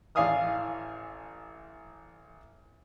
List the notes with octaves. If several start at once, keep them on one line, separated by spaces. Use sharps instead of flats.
A1 D5 F5 G#5 D#6 F6